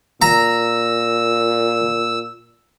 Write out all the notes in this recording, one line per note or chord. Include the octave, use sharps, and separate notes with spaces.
A#2 A#5 E6